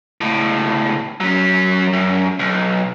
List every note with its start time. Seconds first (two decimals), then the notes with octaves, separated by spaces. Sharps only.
0.21 C#2 A2
1.21 F#3 C#4
1.93 F#2
2.39 B1